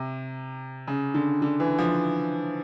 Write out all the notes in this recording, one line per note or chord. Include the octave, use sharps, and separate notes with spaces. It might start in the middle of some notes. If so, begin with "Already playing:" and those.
Already playing: C3
C#3
D3
D3
E3
F3